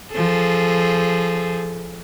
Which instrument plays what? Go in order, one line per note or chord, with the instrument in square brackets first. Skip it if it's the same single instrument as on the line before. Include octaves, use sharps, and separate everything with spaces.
[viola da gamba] F3 G#4 A4